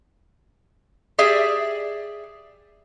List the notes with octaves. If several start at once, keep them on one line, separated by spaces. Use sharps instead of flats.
G4 G#4 D5 E5